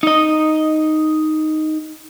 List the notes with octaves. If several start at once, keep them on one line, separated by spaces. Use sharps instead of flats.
D#4 D#5